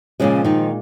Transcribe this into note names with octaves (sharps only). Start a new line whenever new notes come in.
A#2 C#3 F3 G#3 C#4
D#3 D#4